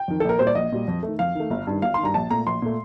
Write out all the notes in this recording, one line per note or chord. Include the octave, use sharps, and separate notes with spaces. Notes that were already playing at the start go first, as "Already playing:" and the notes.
Already playing: G5
F2 D#3
A4
A#1 A#4
A#2 G3 C5
D5
A#1 D#5
A#2 G3
F2
A3
D#3
F2 F5
D#3 A3
G1
G2 D#3
G1 F5
D#3 C6
G2 A#5
A#1 A5
A#2 A3 A#5
A#1 C6
A#2 A3